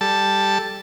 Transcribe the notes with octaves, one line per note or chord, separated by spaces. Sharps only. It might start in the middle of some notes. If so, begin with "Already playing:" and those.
G3 A4 A5